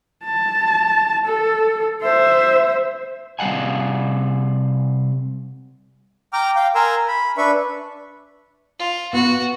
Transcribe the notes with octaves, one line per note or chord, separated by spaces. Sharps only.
A5
A4
C5 E5
C3 G3 F5 F#5 G#5
G5 A#5 D6 F6
F5 G5
A#4 G#5 A#5 C6 E6
B5
D4 B4 E5 B5 C#6
F4
B3 F#4